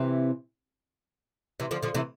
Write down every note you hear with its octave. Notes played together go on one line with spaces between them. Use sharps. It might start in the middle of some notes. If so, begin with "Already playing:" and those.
Already playing: C3 E3
C3 E3
D3 F3
D3 F3
C3 E3